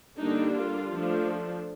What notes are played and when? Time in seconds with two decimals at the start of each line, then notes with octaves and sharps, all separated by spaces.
0.18 D3 G3 A#3 D4 D#4
0.56 F4
0.92 F3 A3 D4